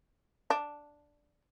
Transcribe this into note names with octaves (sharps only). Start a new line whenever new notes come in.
D4